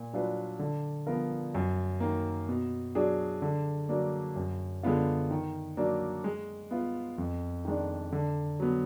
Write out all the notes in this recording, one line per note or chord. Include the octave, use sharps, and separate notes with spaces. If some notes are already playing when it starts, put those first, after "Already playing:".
Already playing: A#2
F#3 D4 F4 B4
D3
F3 B3 F4 A#4
F#2
D#3 A#3
B2
F#3 D4 G#4
D3
F#3 A#3 D4
F#2
D3 G#3 B3 F4
D#3
F#3 A#3 D4
G#3
B3 F4 B4
F2
D#3 G#3 D4
D3
F#3 B3